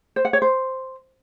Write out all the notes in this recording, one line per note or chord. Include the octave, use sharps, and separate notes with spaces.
C5
F#5
C#5
C5